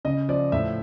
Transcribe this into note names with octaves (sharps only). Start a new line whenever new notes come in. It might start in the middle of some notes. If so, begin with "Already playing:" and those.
C#3 D#5
F3 D5
A2 E5